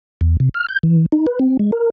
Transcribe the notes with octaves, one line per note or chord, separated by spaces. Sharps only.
E2
C3
F6
G6
E3
D#4
B4
C4
G#3
A#4